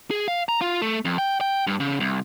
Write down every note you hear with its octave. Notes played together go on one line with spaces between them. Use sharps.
G#4
F5
A#5
F4
A3
F2
G5
G5
G2
C#3
C2